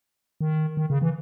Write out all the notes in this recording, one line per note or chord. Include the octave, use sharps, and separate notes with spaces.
D#3
D#3
C#3
E3